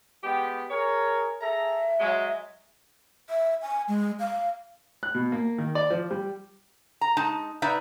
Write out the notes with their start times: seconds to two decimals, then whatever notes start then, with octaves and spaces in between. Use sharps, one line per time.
0.24 G#3 B3 G4
0.70 G#4 A#4 C#5
1.41 G#4 A4 E5 A#5
2.00 F#3 G#3
3.29 E5
3.62 G#5
3.88 G#3
4.20 F5
5.03 F#6
5.15 B2
5.32 A#3
5.58 D#3
5.75 D5
5.90 F3
6.11 G3
7.01 A#5
7.17 G#3 D#4 A5
7.62 D#4 B4 D5 E5